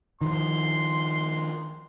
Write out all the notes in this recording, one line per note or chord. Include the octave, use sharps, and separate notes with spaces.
D#3 F3 C6